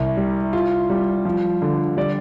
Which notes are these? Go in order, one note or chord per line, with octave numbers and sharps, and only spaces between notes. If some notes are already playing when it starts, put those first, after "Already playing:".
Already playing: C2
G3
F4
G3
F3
D3
G3 D5